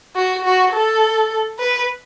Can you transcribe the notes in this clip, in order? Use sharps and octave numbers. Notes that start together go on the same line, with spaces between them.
F#4
F#4
A4
B4